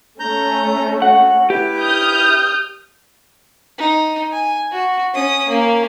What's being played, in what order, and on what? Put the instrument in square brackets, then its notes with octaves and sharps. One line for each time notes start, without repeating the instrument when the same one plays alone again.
[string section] A3 C#4 [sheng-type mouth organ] A#5 G6
[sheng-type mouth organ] F#4 [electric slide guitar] F#5
[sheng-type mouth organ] E4 B4 [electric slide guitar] G4
[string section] D#6 F6 G6
[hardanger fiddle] D#4
G#5
F#4
C#4 D#6
A#3 C#4